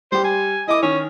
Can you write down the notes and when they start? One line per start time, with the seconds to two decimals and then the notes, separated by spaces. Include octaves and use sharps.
0.12 G3 G4 C5
0.24 G#5
0.68 E4 D#5 D6
0.83 D#3 C#4